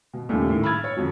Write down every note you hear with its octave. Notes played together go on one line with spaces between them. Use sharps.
B2
D#2 A#2 C#3 G3 A3
A2 D#3
B5 E6 F6 G#6 A6
C#5
F2 D3 F#3